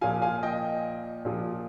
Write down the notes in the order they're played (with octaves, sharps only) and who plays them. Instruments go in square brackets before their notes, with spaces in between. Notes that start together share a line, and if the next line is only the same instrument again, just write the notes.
[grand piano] A#2 F3 F5 G#5
F5 G#5
D#5 G5
A#2 F3